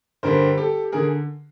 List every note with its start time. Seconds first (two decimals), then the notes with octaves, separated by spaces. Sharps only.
0.23 G2 D3 G3 A#4 C5
0.57 G4 A4
0.92 D3 G#4 A#4